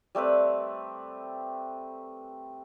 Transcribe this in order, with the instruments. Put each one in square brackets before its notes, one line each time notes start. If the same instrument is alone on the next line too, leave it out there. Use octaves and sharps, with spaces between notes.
[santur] G3 A3 C4 B4